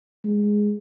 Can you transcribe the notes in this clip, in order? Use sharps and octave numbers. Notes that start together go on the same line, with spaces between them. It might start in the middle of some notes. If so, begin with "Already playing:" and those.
G#3